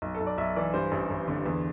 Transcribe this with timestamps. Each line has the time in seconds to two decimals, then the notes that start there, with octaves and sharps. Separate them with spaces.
0.02 B1
0.15 A4
0.20 B1
0.27 D5
0.38 B1 E5
0.56 E3 D5
0.73 G2 C5
0.92 A1
1.10 A1
1.28 D3
1.46 E2